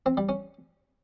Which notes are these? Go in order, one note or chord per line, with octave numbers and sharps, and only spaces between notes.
C4
G3
C#4